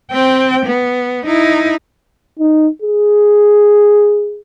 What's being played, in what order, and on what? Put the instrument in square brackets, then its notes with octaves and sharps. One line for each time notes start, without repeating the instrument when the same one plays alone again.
[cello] C4 G5
B3
D#4 E4
[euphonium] D#4
G#4